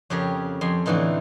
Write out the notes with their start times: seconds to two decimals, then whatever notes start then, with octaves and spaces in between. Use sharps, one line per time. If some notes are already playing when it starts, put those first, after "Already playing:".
0.10 F2 C#3 G4 A#4 C#5
0.61 F2 G#5 C6
0.86 A2 D3 E3 D#4 F4